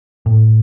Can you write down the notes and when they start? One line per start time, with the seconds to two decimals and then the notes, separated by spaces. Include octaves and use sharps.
0.26 A2